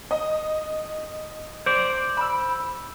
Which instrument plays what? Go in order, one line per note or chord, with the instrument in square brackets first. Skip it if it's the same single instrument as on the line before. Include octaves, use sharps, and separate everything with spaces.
[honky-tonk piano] D#5
[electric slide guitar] C5 D5
[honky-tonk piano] B5 E6